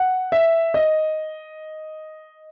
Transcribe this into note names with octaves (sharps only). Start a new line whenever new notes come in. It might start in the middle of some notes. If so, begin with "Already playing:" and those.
Already playing: F#5
E5
D#5